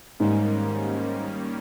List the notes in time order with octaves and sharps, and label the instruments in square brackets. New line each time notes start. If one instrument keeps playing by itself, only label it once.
[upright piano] G#2 [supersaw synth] D#3 G3 A#3 C#4